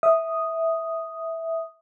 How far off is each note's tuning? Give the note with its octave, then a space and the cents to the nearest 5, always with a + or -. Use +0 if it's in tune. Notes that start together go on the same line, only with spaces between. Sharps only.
E5 -10 D#6 +0